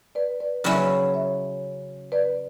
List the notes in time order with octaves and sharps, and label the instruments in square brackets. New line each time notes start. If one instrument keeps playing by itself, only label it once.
[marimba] B4 D5
B4 D5
[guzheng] C#3 F#3 C#4 E4 [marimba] B4 D5
[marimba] C#5 E5
B4 D5